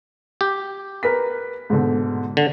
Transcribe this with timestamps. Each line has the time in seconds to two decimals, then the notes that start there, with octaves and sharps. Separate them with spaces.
0.41 G4
1.03 A#4 B4 B6
1.70 G#2 B2 D3
2.37 D3